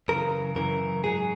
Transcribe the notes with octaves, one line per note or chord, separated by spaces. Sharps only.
F#2 C#3 E3 A#4
F#2 C#3 E3 A#4
G#2 F#3 G#4